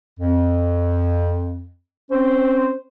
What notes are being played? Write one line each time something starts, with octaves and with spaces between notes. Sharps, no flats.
F2
C4 C#4 C5